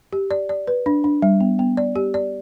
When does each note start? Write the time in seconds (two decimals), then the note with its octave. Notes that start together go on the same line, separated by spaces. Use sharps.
0.13 G4
0.31 D5
0.49 D5
0.67 B4
0.86 D4
1.04 D4
1.22 G3
1.41 B3
1.59 B3
1.77 D5
1.96 G4
2.14 D5